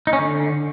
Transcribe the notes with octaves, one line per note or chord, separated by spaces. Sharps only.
D#4
C#4
D3